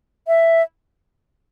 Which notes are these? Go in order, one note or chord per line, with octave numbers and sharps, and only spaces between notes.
E5